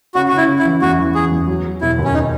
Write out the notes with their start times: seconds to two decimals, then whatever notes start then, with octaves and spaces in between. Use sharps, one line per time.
0.15 C#3 F#4
0.28 F#4
0.32 C#3
0.37 E4
0.48 C#3
0.59 E4
0.65 E3
0.82 E2 F#4
0.99 E3
1.14 E3 G#4
1.32 E2
1.48 F#3
1.64 F#3
1.81 E1 E4
1.99 D#2
2.04 C#4
2.14 D#4